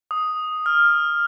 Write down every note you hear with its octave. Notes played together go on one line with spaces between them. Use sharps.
D#6
F6